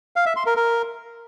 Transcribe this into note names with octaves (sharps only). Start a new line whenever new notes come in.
F5
E5
C6
A#4
A#4